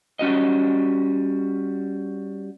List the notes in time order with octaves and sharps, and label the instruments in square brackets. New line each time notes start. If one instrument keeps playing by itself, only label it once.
[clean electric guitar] G3 C#4 F#4 D#5